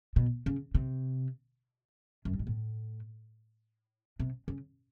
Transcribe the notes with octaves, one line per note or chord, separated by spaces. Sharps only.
B2
C#3
C3
F#2
G2
G#2
A2
C3
C#3